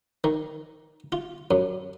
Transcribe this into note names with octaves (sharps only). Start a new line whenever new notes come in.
D#3
F4
F#2